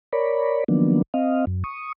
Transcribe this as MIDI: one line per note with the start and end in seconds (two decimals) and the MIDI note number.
0.13 0.64 70
0.13 0.64 73
0.13 0.64 74
0.13 0.64 83
0.68 1.02 51
0.68 1.02 53
0.68 1.02 54
0.68 1.02 58
0.68 1.02 59
0.68 1.02 62
1.14 1.45 60
1.14 1.45 75
1.14 1.45 77
1.47 1.63 42
1.64 1.92 85
1.64 1.92 87